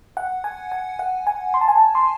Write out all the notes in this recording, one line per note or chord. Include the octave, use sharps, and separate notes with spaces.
F#5
G#5
G#5
F#5
G#5
C6
A5
G#5
A5
C6